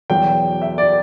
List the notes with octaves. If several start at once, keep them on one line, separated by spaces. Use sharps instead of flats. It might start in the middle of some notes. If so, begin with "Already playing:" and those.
E2 B2 F#3 G5
E5
D5